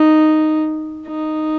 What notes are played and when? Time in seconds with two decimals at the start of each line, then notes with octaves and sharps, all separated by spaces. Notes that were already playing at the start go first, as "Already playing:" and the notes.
Already playing: D#4
1.07 D#4